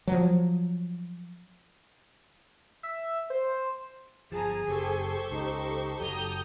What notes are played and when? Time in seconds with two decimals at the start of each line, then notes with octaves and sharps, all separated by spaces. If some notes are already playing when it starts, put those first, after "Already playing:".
0.07 F3 F#3
2.83 E5
3.30 C5
4.32 G1 F3 G#4 A5 A#5
4.68 F#1 G4 A4 C5 C#6
5.31 C#2 D#4
6.01 F#1 F#3 A#5 D#6 G6